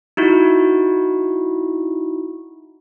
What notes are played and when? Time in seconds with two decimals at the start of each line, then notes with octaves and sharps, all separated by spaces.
0.17 D#4 E4 F#4